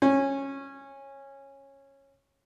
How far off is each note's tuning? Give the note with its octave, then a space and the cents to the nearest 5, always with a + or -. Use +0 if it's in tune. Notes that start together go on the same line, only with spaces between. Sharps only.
C#4 -15